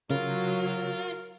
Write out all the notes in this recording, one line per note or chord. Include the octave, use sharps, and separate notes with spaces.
C#3 F#3 F4 A#4